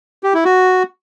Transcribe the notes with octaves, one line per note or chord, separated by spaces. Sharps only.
G4
E4
F#4